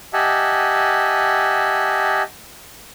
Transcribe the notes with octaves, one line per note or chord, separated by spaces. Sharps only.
G4 D#5 E5 F#5 G#5 A5